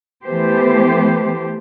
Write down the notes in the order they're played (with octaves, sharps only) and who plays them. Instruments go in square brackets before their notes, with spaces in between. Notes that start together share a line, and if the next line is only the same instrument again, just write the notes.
[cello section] E3 A3 B3 G4 C5